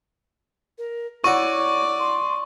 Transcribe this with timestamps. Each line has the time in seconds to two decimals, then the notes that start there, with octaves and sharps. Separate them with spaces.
0.78 A#4
1.24 E4 F#4 C#5 D5 C#6
1.99 C6